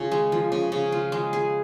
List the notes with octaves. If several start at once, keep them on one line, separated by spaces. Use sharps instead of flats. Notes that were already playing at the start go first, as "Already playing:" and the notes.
Already playing: C#3 F4
G#3
F3
C#3
C#3
F4
G#3
G#4